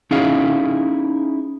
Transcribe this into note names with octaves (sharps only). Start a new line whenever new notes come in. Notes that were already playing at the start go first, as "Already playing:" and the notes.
C#4 D#4 E4 G#4 F5